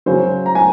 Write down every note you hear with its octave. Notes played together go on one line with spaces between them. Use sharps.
C#3 F#3 C5
A#5
G#5